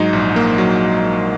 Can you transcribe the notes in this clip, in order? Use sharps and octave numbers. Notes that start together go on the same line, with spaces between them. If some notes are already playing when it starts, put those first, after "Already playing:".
Already playing: G#2 F#3 D#4
A#1
A#3
F#3